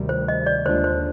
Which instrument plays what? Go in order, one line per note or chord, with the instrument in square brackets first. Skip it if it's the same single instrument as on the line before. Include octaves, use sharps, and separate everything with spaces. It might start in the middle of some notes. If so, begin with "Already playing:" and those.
Already playing: [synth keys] D2 C3 D#3 G3
[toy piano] C5
D#5
D5
[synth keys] D#2 D3 G#3 D4 F4 [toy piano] C5
[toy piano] C5